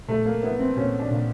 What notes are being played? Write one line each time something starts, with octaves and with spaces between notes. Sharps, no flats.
A#2 A3
A#3
B3 E4
C4
A#2 C#4
D4
A#2